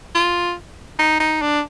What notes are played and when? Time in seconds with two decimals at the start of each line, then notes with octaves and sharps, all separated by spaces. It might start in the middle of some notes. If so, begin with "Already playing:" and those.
0.15 F4
0.99 D#4
1.20 D#4
1.42 D4